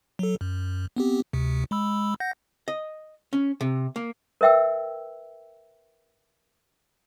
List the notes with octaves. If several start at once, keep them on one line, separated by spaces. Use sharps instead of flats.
F#3 A4
F#2
B3 C4 G4
D2 C3
G#3 B5 E6
F#5 G6 A#6
D#5
C#4
C3
A#3
A#4 B4 E5 G5 E6